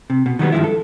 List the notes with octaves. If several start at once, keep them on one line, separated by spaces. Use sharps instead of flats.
C3
B2
D#3 F#3 G3 B3
G2 D#3 F3 G#3 E4
A4